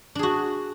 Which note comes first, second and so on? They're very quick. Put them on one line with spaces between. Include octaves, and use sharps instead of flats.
D4 G#4 F#4